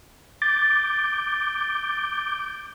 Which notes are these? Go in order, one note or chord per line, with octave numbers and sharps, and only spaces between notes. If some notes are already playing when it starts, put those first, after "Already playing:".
D6 G6 A6